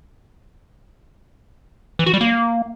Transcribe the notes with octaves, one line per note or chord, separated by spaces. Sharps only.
E3
F#4
G3
A#3